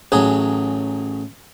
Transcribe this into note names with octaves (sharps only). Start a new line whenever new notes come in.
A1 F#3 G#4